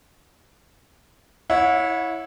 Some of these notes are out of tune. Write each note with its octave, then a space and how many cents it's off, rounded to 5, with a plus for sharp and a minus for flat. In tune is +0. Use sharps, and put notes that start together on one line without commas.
E4 -10 C#5 +5 F#5 -35